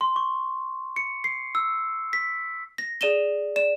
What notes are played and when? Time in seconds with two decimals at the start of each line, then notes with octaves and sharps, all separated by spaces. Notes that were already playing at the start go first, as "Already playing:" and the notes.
0.01 C6
0.16 C#6
0.96 C#7
1.24 C7
1.55 E6
2.13 B6
2.78 A#6
3.01 G#4 D5 D#7 E7 G7
3.56 D5 E7